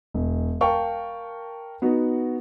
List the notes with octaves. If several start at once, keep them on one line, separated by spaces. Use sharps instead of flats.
E1
A#4 F5 G5 A5 C#6
B3 D#4 F#4